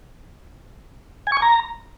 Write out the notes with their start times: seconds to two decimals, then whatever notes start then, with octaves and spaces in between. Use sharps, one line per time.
1.27 G#5
1.32 C#6
1.37 G#5
1.42 A#5